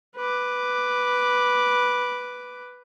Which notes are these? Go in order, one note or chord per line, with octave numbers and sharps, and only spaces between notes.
B4 D6